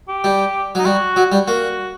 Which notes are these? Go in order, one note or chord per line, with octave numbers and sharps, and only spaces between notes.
G4
G3
F#3 D#4
G3 F#4
F#3
G3
A#3 F#4